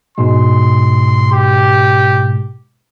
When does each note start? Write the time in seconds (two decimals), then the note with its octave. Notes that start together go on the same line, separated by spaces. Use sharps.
0.18 G#2 B2 G#3 C6
1.32 G4